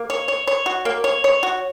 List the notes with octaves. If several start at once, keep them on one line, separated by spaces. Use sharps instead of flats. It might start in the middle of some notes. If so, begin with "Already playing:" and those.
Already playing: A#3
C#5
C#5
C#5
F#4
A#3
C#5
C#5
F#4